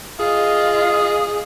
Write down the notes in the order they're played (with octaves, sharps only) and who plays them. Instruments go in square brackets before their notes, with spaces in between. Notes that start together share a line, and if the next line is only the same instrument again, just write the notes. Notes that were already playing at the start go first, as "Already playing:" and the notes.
[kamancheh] F4 D#5 [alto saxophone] G#4